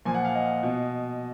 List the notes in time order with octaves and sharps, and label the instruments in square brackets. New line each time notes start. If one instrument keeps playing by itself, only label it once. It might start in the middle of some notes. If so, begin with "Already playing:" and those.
[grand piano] A#2 F3 G#5
F#5
F5
D#5
B2